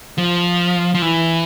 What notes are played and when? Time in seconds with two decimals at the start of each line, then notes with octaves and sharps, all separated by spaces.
0.18 F3
0.95 F3
1.02 E3